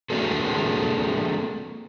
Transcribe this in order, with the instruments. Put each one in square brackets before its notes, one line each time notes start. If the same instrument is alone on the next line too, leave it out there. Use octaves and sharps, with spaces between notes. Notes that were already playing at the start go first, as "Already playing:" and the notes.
[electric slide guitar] A#3 C4 D4 F#4 G#4 A4